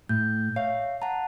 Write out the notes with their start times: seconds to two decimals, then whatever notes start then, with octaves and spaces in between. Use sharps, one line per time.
0.09 A2 G6
0.56 C#5 E5 F5
1.02 F#5 A5 A#5